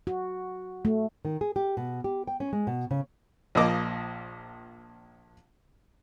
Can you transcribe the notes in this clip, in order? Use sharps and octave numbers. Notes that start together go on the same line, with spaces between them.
F#4
A3
D#3
G#4
G4
B2
G4
G5
C#4
G#3
B2
C#3
A#1 A#2 F3 A#3 D#5 D6